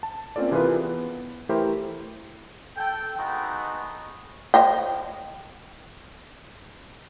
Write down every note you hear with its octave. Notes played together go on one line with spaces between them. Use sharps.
A5
A#3 C4 C#4 F4 A4 D5
C3 E3 F4 G#4 A#4 B4
B3
E3 A3 E4 G4 A#4 C5
A4 G5
G#3 A3 B3 D#4 F#4
C5 D#5 G5